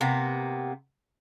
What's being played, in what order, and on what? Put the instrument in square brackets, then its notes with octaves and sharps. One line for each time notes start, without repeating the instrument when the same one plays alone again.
[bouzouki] C3 A#3 B3